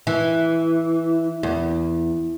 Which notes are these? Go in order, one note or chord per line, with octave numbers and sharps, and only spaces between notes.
E3
E2